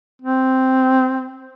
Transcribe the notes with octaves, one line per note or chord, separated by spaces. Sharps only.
C4